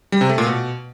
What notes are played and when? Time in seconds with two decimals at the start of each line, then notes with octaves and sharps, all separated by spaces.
0.12 G3
0.21 C3
0.29 A3
0.38 A#2
0.46 B2